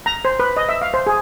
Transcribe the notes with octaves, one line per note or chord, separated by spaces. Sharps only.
A#5
C5
B4
D#5
E5
F5
C5
G#4